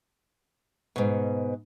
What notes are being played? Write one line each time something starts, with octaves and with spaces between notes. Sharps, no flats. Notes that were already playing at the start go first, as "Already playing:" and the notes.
G#2 B2